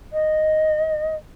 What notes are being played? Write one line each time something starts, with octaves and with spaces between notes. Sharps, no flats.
D#5